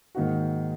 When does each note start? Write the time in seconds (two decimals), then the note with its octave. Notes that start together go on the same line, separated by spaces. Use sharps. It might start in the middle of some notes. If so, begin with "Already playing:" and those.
0.15 G#2 D#3 A#3 D#4 F#4